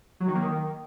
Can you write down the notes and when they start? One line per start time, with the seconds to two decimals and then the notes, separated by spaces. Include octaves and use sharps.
0.20 F#3
0.28 D#3
0.35 A#3
0.42 D#3